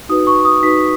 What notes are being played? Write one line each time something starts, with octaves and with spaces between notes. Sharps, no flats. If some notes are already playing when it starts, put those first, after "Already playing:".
D#4 F#4 B4 D#6
C#6
D#6
D#4 F#4 B4 B6